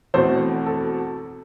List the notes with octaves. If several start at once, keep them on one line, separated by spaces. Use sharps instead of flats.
E2 B2 A3 C4 A4 C5
A4